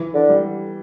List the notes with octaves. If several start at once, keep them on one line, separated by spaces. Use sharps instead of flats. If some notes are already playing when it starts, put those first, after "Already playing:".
Already playing: E3
D3
G3